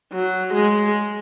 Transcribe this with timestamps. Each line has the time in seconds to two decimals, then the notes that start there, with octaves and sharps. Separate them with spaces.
0.12 F#3
0.54 G#3